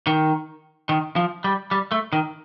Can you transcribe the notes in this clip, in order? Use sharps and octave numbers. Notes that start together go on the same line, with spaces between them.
D#3
D#3
F3
G3
G3
A3
D#3